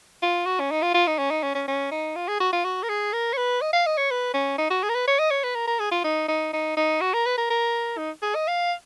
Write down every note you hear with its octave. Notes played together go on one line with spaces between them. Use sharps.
F4
F#4
C#4
D#4
F4
F4
D#4
C#4
D#4
C#4
C#4
C#4
D#4
F4
G#4
F#4
F4
F#4
A#4
G#4
A#4
C#5
B4
D#5
F5
D#5
C#5
B4
C#4
D#4
F#4
G#4
A#4
B4
C#5
D#5
C#5
B4
A#4
A#4
G#4
F4
D#4
D#4
D#4
D#4
F#4
A#4
B4
A#4
A#4
D#4
G#4
D#5
F5